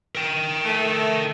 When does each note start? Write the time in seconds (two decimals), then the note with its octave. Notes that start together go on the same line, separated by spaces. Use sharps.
0.15 A#4 G5
0.65 A3